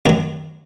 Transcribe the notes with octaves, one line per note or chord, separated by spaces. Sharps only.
F#2 D#3 F#3 A#4